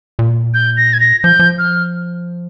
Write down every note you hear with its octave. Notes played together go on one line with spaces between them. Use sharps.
A#2
G6
A#6
G#6
A#6
F3 G6
F3
F6